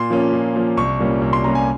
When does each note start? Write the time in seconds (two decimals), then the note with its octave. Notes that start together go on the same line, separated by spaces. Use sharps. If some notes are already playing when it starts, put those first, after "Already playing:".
Already playing: A#2 C6
0.10 F3 A#3 C#4
0.33 A#2
0.55 F3 A#3 C#4
0.77 C2 C#6
0.99 A#2 G3 A#3 C#4
1.22 C2
1.33 C6
1.44 A#2 G3 A#3 C#4 A#5
1.55 G#5